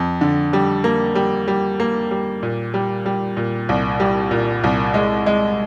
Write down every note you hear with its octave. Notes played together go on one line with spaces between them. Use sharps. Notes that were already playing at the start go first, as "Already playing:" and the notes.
Already playing: F2
D3
G3
A#3
G3
G3
A#3
G3
A#2
G3
G3
A#2
C2
G3
A#2
C2
G#3
G#3